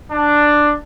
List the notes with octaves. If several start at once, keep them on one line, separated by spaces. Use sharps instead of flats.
D4